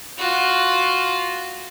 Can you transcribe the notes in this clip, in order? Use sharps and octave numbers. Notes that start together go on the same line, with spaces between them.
F4 F#4